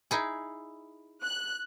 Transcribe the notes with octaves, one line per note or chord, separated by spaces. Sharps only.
D#4 E4 G#4
F#6